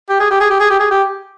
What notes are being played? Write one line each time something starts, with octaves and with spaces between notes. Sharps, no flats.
G4
G#4
G4
G#4
G4
G#4
G4
G#4
G4